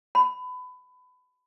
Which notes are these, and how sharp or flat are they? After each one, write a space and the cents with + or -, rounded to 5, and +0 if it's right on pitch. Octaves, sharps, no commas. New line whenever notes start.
B5 +25